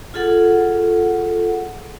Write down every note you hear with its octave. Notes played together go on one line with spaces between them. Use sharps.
F4 G#4 A4 F#5